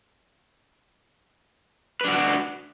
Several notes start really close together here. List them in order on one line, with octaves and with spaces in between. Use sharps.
B4 D4 F#4